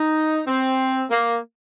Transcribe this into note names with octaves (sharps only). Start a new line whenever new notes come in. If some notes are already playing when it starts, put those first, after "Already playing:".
Already playing: D#4
C4
A#3